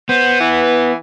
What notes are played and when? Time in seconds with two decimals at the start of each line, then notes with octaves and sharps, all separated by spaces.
0.09 B3 C5
0.40 E3